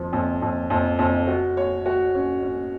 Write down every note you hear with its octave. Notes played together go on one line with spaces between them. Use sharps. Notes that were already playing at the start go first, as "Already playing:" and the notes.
Already playing: F2 F3
F2
F2
F2
F2
F#4
C#5
F#4
C#4
C#4